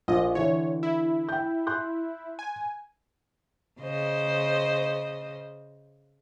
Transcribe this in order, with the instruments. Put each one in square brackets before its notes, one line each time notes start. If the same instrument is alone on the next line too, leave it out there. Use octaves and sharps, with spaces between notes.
[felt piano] A#1 A#2 [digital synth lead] D#5
[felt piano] D3 E3 [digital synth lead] C#5
[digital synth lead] E4
[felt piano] G5 G6
C6 F#6 G6
[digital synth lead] G#5
[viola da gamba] C#3 C5 D#5